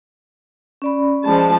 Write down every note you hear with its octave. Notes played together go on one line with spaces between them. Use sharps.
C#4 D5 B5
F3 G#3 A5